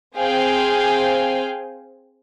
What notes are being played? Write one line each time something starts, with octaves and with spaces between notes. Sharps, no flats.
C4 G#4 C5 F5 G5 G#5